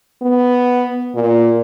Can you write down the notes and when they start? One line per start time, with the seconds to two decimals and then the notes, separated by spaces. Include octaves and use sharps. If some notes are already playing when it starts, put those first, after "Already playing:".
0.22 B3
1.14 A#2